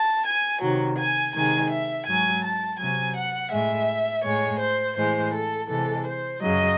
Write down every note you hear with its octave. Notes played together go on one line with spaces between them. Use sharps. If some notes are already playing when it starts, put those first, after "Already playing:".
Already playing: A5
G#5
C3 D#3 F#3
G#5
C3 D#3 G#3 G#5
E5
G#2 F#3 G#5
A5
C3 F#3 G#5
F#5
A2 G#3 E5
A2 G#3 C#5
C5
A2 E3 G#3 C5
A4
C3 E3 G#3 A4
C5
F#2 C#3 F#3 D#5